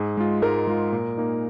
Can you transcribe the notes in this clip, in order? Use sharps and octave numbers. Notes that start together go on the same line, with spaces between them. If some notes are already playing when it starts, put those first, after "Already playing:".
Already playing: G#2 G#4
G#3 F4
G#2 A#4
G#3 F4
A#2
A#3 D#4